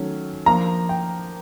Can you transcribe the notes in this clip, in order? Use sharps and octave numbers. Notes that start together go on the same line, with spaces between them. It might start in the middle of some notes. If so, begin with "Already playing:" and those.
Already playing: D#3 F#3 A3 C#4
F3 A#3 D4 A#5
G5